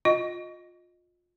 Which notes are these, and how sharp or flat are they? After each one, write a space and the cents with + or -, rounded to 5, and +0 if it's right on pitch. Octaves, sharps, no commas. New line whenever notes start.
F4 +25 D#5 +0